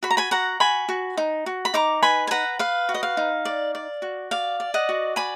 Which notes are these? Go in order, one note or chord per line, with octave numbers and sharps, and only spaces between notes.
F#4 B5
A#5
G#5 B5
F#4 F#5 A#5
F#4 G#5 B5
F#4
D#4
F#4
B5
D#4 A#5 D6
B4 G#5 B5
G#5
B4 F#5 A#5
B4 F5
F#4
D#5
F5
D#4
D5
D5
F#4
D5 F5
D5
D#5 F#5
F#4
D5 G#5 B5